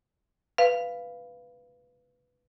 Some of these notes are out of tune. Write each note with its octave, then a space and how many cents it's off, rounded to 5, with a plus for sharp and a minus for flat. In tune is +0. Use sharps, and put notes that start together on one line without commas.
B4 +0 F5 -15